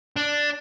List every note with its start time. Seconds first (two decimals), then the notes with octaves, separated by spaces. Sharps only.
0.16 D4